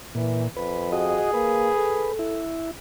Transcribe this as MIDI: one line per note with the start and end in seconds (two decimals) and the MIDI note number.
0.15 0.48 46
0.15 0.45 52
0.57 1.23 41
0.57 0.92 71
0.92 1.31 66
0.92 2.18 68
0.92 1.31 75
1.34 1.70 58
1.34 2.12 71
1.77 2.42 69
2.19 2.71 64